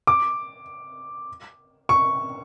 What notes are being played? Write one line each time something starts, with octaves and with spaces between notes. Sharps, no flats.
D6
C#6